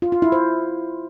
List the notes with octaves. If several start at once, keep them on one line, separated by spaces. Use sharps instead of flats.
F4
F4
E4
C5